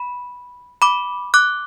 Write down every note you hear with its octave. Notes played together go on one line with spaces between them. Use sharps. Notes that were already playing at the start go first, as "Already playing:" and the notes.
Already playing: B5
B5 D6
D6 F#6